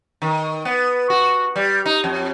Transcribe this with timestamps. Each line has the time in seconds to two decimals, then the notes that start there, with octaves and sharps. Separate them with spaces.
0.22 D#3
0.65 B3
1.10 F#4
1.56 G3
1.86 D#4
2.04 F2